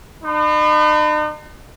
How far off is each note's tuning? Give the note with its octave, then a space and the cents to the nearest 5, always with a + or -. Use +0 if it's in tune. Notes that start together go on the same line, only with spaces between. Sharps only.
D#4 -45 B5 +30